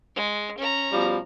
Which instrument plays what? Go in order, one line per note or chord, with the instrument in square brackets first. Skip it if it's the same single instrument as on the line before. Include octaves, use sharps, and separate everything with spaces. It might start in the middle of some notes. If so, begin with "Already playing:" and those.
[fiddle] G#3
C#4 A#5
[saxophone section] B2 F3 G3